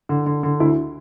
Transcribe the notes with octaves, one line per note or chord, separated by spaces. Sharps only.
D3
D3
D3
D2 E4